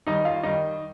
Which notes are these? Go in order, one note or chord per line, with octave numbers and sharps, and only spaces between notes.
D#2 D#3 G3 D#4 D#5
F4 F5
D#2 D#3 G3 D#4 D#5